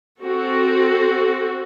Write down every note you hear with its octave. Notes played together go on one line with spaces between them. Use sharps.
C4 F#4 A4